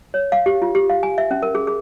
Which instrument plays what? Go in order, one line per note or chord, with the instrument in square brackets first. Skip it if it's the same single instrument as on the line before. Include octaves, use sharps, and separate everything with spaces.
[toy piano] C#5
F5
G4
F4
G4
F5
G#5
E5
C#4
A#4
G#4
G#4